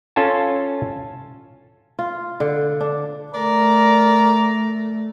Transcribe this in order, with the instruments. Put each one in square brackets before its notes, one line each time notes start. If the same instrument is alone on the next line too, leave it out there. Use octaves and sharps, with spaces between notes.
[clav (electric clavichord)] C#4 F4 A4 G#5 A5
[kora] F4
D3
D4
[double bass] A3 [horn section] A#4 D5 A#5